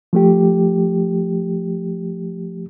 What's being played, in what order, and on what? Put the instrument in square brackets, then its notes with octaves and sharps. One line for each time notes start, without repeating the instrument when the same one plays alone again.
[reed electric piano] F3 A3 G4